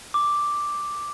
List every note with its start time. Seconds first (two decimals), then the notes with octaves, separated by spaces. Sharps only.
0.14 D6